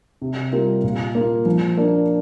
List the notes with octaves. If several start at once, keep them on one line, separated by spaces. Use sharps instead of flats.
C3
G3 A#3 F4 A#4
A#2
A#3 F4
F3
A#3 D4